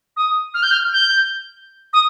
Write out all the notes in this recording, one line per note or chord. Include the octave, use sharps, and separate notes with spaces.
D#6
F6
G6
F6
G6
D#6